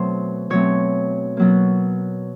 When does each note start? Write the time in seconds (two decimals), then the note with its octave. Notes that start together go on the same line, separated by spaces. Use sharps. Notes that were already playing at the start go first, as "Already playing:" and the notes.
Already playing: B2 F#3 A3 C4 C5
0.50 B2 F#3 A3 C4 C#5
1.37 B2 F#3 A#3